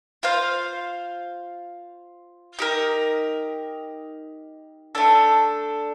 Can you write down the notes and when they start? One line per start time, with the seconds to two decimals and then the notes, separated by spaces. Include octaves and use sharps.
0.23 F4 C5 F5
2.59 D#4 G4 A#4
4.95 A3 D4 A4